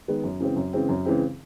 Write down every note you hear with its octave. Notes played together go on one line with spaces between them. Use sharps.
D#3 G#3 B3
F#2
C#3 E3 G#3 C4
F#2
C#3 E3 G#3 C4
F#2
C#3 E3 G#3 C4